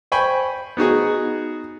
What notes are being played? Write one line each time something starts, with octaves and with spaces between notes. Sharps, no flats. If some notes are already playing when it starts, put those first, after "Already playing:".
C5 G5 G#5 B5 C#6
B3 D#4 F#4 G#4